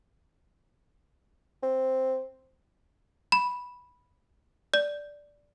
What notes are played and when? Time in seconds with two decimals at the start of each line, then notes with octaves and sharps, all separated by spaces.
1.63 C4
3.32 B5
4.74 D5